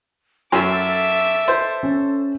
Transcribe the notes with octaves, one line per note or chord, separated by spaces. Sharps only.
F#2 A4 E5 D6
C5
C#4